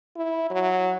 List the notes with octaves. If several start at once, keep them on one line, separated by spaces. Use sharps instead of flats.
E4
F#3